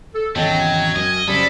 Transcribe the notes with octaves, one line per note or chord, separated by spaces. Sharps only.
A4
G#1 E2 C#3 F#3 D#5 G5 A5
G#6
F#2 C#4 D#5
F#2 C#3 G3 F4 A4 C5 D5 B5